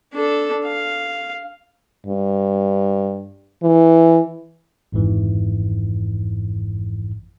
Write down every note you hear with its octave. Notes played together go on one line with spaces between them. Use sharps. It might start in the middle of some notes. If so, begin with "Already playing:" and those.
D4 A4
F5
G2
E3
G#1 F2 G#2 E3